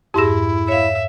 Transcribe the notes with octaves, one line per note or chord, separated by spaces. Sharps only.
F2 G#2 E4 G4 G#4 A#6
C#5 E5 F5